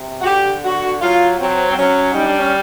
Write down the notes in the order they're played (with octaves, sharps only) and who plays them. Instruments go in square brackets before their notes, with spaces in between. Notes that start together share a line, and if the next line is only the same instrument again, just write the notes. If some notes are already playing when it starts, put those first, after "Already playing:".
Already playing: [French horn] C3
[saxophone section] F#4
[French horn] D3 [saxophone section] G4
[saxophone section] F#4
[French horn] F#3 [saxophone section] F4
[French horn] F#3 [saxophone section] C4
[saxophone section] C4
[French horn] F#3 [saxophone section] C#4
[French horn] G3 [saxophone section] D#4
[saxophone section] D4
C#4